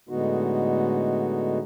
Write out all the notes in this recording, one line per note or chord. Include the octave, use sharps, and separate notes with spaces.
A2 D3 G#3 B3 D#4 F#4